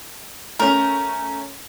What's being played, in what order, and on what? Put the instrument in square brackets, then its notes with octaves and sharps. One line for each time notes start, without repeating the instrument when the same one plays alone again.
[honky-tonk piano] A3 C#4 [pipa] A#4